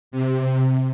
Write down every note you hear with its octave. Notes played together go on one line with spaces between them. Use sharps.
C3